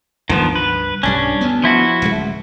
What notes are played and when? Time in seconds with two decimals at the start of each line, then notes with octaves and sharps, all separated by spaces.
0.29 C#2 G2 D#3 F3 B3
0.55 B4
1.03 B1 G2 G3 C#4 D4
1.41 D2 B3
1.64 F3 E4 F#4
2.02 D1 C#2 G#3